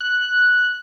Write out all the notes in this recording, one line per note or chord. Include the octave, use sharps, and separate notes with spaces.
F#6